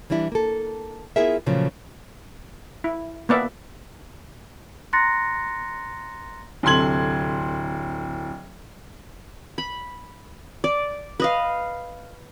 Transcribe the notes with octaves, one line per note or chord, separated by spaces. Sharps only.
E3 G3 D4 E4
A#3 A4
B3 E4 F4 G#4 A#4 E5
A#2 C#3 F3 F#3 A3
E4
A#3 B3 D5 E5
A#5 C6 F#6 A6 A#6 C#7
D1 C3 A4 C6 G#6 F#7
B5
D5
B4 D#5 F5